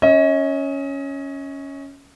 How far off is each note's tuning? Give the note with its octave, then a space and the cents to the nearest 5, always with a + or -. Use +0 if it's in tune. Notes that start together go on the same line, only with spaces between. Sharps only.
C#4 +0 D#5 +35